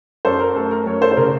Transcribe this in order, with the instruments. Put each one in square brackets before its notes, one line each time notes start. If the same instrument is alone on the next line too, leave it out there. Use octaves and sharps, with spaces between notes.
[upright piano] F#2 A4 C5
A#4
A3 A4
A#4
F#2 A#4 C#5
A4 C5
C5
C#3 A#4